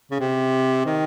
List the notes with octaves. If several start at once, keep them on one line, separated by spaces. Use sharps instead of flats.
C#3
C3
D#3